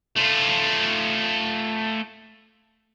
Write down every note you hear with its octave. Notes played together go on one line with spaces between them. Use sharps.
A3 F4